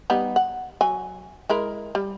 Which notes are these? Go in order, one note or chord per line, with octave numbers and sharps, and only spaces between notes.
G3 B3 D#4
F#5
F#3 G#5
G#3 E4 A#4
G3